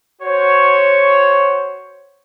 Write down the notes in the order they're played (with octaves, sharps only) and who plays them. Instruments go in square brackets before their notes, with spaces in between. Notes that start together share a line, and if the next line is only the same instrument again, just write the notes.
[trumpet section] F#4 C5 C#5